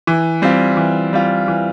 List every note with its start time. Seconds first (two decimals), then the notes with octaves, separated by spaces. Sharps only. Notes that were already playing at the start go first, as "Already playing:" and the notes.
0.07 E3
0.42 G3 C4 F4
0.77 E3
1.13 G3 C4 F4
1.48 E3